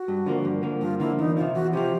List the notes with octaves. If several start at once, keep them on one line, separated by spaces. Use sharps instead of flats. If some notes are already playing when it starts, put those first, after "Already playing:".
Already playing: F#4
G2
D3 F3 A#3
G2
D3 F3 A#3
G2 F4
D3 F3 A#3 E4
E2 D#4
C3 F3 F4
E2 F#4
C3 F3 G4